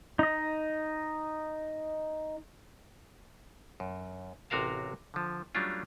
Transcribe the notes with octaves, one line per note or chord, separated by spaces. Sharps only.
D#4 D#5
F#2
A1 C3 F#4 A#4 F5 A5
D3 F3
F#3 G3 A3 C#4 D4 F4